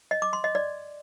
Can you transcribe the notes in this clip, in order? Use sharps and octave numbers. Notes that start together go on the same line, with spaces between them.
D#5
D6
C6
D#5
D5